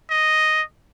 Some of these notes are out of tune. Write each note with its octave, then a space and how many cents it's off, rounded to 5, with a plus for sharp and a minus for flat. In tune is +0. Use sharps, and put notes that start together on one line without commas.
D#5 +0